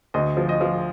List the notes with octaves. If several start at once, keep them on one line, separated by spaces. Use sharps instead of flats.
D2 D#5
F3
D#5
F3